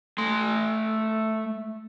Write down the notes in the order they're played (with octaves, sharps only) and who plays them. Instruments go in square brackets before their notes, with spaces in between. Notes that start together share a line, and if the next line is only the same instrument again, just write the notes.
[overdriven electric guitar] A3 C6